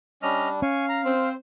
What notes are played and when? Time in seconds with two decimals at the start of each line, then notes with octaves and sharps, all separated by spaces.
0.22 G3 C#4 D4 D#5 F6
0.62 C#4 F5 G#5 C#6
0.89 A#5
1.05 C4 C5